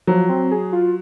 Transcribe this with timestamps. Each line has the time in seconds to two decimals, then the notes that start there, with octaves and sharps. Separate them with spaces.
0.07 F3 F#3
0.29 C4
0.51 G#4
0.72 F4